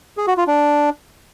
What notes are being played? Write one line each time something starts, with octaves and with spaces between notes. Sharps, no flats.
G#4
F#4
F4
D4